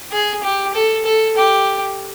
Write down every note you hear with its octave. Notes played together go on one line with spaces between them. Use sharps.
G#4
G4
A4
A4
G4